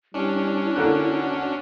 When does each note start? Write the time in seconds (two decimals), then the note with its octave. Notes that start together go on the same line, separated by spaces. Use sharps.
0.14 G3 C#4 D4 E4
0.76 D3 A#3 F#4 F#6